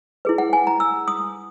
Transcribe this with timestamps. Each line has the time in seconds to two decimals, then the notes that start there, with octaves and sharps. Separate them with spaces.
0.25 E4 G#4 B4
0.38 F#5
0.53 G#5
0.67 A#5
0.80 E6
1.08 D#6